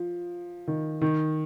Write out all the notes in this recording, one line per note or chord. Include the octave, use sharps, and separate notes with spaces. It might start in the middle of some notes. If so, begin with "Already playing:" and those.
Already playing: F3
D#3
D#3